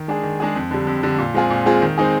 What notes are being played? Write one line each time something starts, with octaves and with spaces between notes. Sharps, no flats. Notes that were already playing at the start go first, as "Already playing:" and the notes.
Already playing: D#3
G#3 D4 G#4
D#3
G#3 D4 G#4
F2
D3 G3
F2
D3 G3
A#2
G#3 C4 F4 G#4
A#2
G#3 C4 F4 G#4
D#3
G#3 C4 D#4 G#4